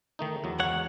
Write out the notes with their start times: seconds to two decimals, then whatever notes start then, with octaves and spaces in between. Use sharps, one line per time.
0.19 D#3 A3 D#4
0.44 E2 F#3
0.60 C#2 C#5 F#5